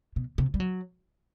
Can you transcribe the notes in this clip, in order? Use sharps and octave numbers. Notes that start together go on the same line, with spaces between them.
B2
C3
G3
F#3